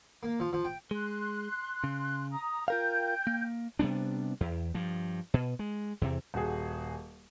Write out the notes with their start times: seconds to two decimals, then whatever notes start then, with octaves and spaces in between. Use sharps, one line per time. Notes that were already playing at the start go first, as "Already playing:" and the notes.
0.23 A#3
0.40 F3
0.53 F3
0.65 G5
0.91 G#3 C6 F#6
1.84 C#3
2.32 A#5 D#6
2.68 F4 A#4 F5 G5 G6
3.27 A#3
3.79 C3 G3 B3 D4
4.41 E2
4.74 G2 F3
5.34 B2
5.59 G#3
6.01 E2 C3 E3
6.34 D#1 F#4 G#4